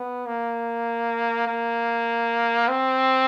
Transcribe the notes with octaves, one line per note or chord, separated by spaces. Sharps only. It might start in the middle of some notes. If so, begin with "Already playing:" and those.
Already playing: B3
A#3
A#3
C4